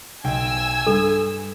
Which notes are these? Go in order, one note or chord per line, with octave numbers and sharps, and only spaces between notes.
B1 G5 G#5 E6
G2 A4